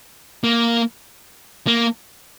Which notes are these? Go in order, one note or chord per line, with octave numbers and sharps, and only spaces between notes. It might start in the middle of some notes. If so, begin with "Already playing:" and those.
A#3
A#3